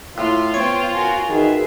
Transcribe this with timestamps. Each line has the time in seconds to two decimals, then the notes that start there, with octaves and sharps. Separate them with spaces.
0.18 A2 F4
0.54 B3 C5 C#5 G5
0.93 F#4 A#4 G#5
1.29 D#3 F#4 G#4 B4 E5